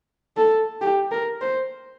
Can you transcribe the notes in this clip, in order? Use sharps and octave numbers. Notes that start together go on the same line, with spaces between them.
A4
G4
A#4
C5